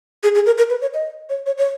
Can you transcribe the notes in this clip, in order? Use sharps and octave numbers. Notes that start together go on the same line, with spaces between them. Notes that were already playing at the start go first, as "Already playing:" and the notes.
G#4
G#4
A#4
A#4
B4
C#5
D#5
C#5
C#5
C#5